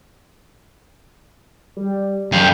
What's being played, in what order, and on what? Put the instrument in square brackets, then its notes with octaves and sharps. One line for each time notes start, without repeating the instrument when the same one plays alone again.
[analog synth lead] G3
[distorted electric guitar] F#2 F5 [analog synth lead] G5